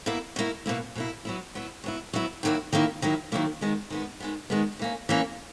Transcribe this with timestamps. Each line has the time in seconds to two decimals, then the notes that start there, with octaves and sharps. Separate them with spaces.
0.06 B2 A#3 E4
0.36 B2 A#3 E4
0.66 B2 A#3 E4
0.95 B2 A#3 E4
1.25 F#3 B3 E4
1.55 F#3 B3 E4
1.84 F#3 B3 E4
2.13 F#3 B3 E4
2.43 D#3 F#3 A#3 E4
2.73 D#3 F#3 A#3 E4
3.02 D#3 F#3 A#3 E4
3.32 D#3 F#3 A#3 E4
3.61 D#3 G#3 B3
3.90 D#3 G#3 B3
4.20 D#3 G#3 B3
4.50 D#3 G#3 B3
4.79 E3 A#3 C#4
5.09 E3 A#3 C#4